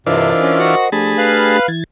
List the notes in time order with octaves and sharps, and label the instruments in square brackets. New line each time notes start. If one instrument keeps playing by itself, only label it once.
[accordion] G2 C3 [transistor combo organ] E3 D4 F4 [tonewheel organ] A#4 C5 D#5
[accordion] C#4
F#4 F#5
[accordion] F3 [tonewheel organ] A3 D4 G4 [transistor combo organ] G#4 A5 B5
[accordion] B4 F5 F#6
[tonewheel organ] E3 G#6 A6